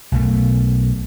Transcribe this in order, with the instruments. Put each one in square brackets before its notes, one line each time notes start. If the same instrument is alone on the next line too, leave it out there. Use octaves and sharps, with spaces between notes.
[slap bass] B1 B2 A3